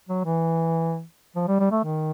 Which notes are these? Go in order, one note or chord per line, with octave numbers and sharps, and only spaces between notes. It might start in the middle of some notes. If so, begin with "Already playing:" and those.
F#3
E3
F3
G3
G3
A3
D#3